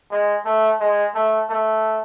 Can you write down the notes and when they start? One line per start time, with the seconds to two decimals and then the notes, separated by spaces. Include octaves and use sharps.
0.11 G#3
0.45 A3
0.80 G#3
1.15 A3
1.50 A3